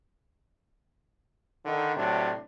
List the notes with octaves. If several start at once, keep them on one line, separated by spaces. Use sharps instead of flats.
D3 D#3
A2 C3 F#3 D4